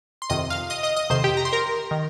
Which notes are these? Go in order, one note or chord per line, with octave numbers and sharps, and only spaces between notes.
C6
F2 C3 D#3 D#5 D#6
F5 F6
D#5 D#6
D#5 D#6
D#5 D#6
F2 C3 D#3 C5 C6
G4 G5
A#5
C6
A#4 A#5
D#3